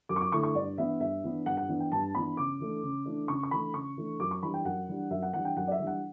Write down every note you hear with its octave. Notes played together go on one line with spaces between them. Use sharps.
F#2 D6
C#6
D6
D3 A3 E4 C#6
C#6
G2 D5
E3 B3 D4 E5
G2 E5
E3 B3 D4
G2 F#5
F#5
E3 B3 D4
G5
G2 A5
E3 B3 D4 B5
C#3 D6
E3 A3 D4
C#3
E3 A3 D4
C#3 C#6
C#6
E3 A3 D4 B5
C#3 C#6
E3 A3 D4
F#2 D6
C#6
E3 G3 D4 B5
G5
F#2 F#5
E3 G3 D4
F#2 E5
F#5
E3 G3 D4 F#5
G5
F#2 F#5
D5
E5
E3 G3 D4
F#5